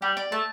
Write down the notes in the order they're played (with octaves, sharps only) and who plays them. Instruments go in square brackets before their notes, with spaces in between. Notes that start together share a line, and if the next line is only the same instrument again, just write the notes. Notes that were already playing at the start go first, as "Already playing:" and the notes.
[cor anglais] G3 [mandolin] G4
[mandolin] D5
[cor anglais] A3 [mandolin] A5